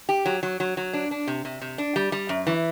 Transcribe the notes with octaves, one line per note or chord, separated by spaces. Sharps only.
G4
F#3
F#3
F#3
F#3
D4
D4
C3
C3
C3
D4
G3
G3
F#2
E3